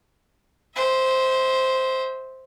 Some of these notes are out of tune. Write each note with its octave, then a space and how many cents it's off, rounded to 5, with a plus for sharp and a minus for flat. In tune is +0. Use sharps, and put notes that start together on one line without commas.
C5 +0 E5 -40